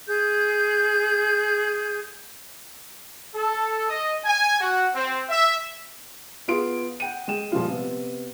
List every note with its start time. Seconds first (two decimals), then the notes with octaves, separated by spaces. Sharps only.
0.07 G#4 G6
3.34 A4
3.89 D#5
4.25 G#5
4.59 F#4
4.93 C4
5.29 E5
6.48 B3 F4 G#4 C6 D7
7.00 F#5 G5 D#7
7.28 G#3 G5 E7
7.52 A#2 F3 G3 G#3 F4
7.70 C3 B3